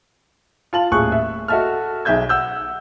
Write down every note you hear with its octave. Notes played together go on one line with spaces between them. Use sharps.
F4 A5 F#7
D#1 A2 G#4 C#6 F#6
E5
F#4 A4 D#5 E5 A5 F6
B1 G#4 E5 G6 G#6
F#5 E6 G6